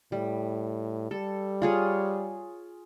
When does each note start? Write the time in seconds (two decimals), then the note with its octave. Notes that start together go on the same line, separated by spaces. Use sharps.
0.12 A2 G3
1.11 G3 A4
1.62 F4 G#4 C#5